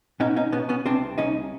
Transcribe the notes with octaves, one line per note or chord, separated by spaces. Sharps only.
B2 C#4 D#4
C#4 D#4
B2 B3 C#4
B3 C#4
C2 C4 D4
C2 C#4 D#4